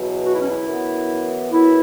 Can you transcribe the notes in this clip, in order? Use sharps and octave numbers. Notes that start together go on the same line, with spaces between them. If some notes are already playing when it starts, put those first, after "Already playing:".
Already playing: E2 B2 F#3
F#4
E4
C#4
E4
F#2 E3 B3
F#2 E3 B3 E4